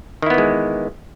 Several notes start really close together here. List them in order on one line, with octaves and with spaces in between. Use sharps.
D#3 E4 B3 E3 G#3